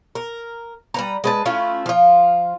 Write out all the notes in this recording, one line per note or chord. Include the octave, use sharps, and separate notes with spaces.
A#4
G3 B4 A#5
G#3 B4 A5
A3 C#4 E4 F4
F3 F4